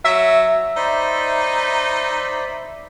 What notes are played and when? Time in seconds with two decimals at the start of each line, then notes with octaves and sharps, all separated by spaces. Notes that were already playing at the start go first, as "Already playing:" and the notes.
0.05 F#3 E5
0.77 D#4 C5 D5 B5